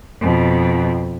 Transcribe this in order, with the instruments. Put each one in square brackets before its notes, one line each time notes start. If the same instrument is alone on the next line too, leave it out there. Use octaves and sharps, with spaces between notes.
[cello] F2 B2